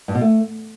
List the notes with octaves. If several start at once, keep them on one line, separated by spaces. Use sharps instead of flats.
G2
B2
A3